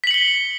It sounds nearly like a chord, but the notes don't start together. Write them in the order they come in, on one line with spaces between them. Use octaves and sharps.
B6 F#7 C#7 G7